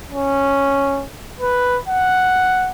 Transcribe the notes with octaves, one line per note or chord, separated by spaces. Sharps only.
C#4
B4
F#5